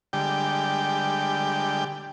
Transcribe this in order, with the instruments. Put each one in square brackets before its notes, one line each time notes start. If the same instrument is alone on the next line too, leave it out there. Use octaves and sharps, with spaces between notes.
[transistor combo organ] D3 G3 G#3 G4 G5